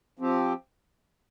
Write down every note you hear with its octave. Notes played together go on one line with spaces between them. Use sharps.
F3 C4 G4